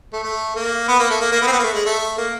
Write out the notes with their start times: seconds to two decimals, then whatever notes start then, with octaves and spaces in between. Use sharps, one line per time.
0.13 A3
0.23 A3
0.56 A#3
0.88 B3
0.99 A#3
1.10 A3
1.20 A#3
1.32 A#3
1.42 B3
1.47 C4
1.52 B3
1.59 A#3
1.63 A3
1.74 G#3
1.86 A3
2.18 A#3